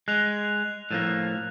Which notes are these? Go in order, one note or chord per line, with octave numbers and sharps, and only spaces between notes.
G#3 F#6 F7
A2 F3 A#3